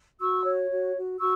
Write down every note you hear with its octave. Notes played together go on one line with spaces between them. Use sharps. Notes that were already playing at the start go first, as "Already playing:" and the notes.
F#4 C#6 E6
C#5
F#4
F#4
F#4 C#6 E6